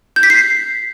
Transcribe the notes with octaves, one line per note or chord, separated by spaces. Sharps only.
G6
B6
C7